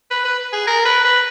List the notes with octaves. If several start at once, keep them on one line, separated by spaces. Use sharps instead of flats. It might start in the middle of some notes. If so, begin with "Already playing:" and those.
B4
B4
G#4
A#4
B4
B4